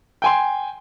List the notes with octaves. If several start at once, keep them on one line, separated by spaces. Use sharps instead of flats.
G5 G#5 C6